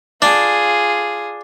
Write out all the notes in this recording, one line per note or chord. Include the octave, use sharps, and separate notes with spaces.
D4 F4 G#4